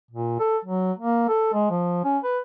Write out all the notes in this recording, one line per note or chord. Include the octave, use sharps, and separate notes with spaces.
A#2
A4
F#3
A#3
A4
G#3
F3
C#4
B4